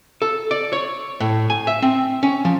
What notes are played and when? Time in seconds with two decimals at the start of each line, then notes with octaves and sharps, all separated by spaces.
0.22 A4
0.51 D5
0.73 C#5
1.20 A2
1.50 G#5
1.67 E5
1.82 C4
2.23 C#4
2.45 F3